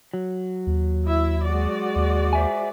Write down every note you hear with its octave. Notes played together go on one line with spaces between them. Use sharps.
F#3
D#2
E4 E5
G#3 F#4 D5
D#2
C5 E5 G#5